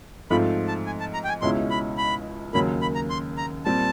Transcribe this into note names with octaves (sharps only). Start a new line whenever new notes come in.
G#2 F3 A3 C4 F4 B5
A5
G#5
A5
A#5
G5
G#5
C#2 B2 G#3 C#4 E4 C6
B5
B5
D#2 C#3 F#3 A#3 B5
B5
A#5
C6
A#5
A#2 G3 C4 A5